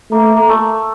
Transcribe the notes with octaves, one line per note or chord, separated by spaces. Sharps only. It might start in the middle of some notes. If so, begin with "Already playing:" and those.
A3 A#3
A#3
A3